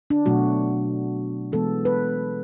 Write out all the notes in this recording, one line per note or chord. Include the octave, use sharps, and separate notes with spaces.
D4
B2 F#3 A3 F#4
E3 G#3 B3 A4
B4